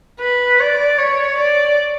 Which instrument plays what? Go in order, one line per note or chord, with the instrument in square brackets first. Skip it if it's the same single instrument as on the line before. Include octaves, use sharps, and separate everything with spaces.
[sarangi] B4
D5
C#5
D5